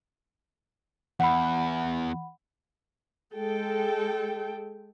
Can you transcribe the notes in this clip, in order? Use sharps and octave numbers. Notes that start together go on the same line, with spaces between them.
E2 F#5 B5
G#3 A4 G5